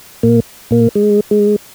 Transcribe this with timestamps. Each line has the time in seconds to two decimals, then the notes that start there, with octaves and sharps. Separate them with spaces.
0.23 A#2 A#3
0.71 A#2 A#3
0.95 G#3
1.31 G#3